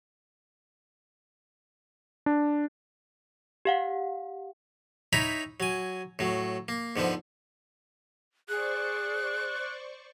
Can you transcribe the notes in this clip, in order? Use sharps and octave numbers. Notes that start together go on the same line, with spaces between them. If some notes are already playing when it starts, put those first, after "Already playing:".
D4
G4 F5 F#5
D#4 E4 C#5 G5 A#5 B5
F#3 G#5
A2 F#3
A#3
G#2 D3 F3 B3
G#4 C5 D5 C#6 F#6